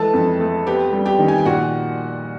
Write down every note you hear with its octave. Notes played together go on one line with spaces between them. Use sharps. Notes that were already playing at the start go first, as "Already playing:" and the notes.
Already playing: E3 G#3 A4 A5
F2
A3
B3 G4 G5
G3
G4 G5
D#3
G#5
G5
A#2 F#4 F#5